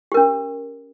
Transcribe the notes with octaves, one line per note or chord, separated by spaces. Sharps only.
C#4 G4 A#4